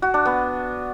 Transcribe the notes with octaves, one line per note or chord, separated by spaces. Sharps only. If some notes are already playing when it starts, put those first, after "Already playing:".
F#4
D4
B3